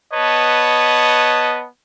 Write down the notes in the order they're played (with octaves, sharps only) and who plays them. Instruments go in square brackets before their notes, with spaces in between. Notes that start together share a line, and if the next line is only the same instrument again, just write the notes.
[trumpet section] B3 B4 C#5 D#5 A5